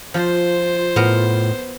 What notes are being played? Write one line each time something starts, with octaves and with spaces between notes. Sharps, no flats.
F3 F4 C5
A2 B3 A#4